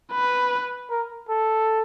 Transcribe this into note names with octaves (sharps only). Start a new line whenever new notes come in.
B4
A#4
A4